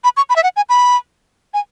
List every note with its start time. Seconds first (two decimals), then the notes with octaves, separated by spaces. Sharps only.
0.04 B5
0.17 C#6
0.29 B5
0.36 E5
0.43 F#5
0.56 G#5
0.69 B5
1.54 G#5